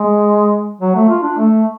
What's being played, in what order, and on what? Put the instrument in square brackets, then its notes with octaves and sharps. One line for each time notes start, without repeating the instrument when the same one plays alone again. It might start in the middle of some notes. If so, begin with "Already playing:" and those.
Already playing: [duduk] G#3
F#3
A3
F4
D4
A3